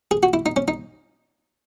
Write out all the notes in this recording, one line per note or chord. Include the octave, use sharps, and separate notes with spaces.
G#4
F#4
E4
D#4
C#4
D#4